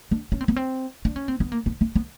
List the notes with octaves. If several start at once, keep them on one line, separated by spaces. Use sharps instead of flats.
D4
C#4
C4
B3
C4
D4
C#4
C4
B3
A#3
B3
C4
B3